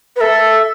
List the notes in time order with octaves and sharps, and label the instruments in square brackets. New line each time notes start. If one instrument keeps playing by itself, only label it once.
[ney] B4
[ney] A4 [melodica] E5